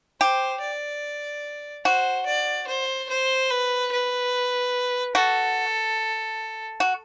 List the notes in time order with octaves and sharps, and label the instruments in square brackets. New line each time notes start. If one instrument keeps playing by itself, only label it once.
[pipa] G4 [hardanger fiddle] C5
[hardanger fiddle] D5
[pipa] F#4 [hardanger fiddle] C5
[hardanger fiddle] D5
C5
C5
B4
B4
[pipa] F#4 [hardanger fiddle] A4
[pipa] F#4